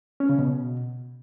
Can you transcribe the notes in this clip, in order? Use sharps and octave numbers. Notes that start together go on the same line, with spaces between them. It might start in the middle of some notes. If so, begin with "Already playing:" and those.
C#4
C#3
B2